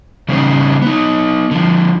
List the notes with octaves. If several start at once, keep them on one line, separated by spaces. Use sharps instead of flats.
C#3 G3 C4 C#4 D#4 C5
B3 D#4
D3 F3